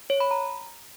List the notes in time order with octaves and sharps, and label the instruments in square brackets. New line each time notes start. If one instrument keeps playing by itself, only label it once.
[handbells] C#5
B5
A#5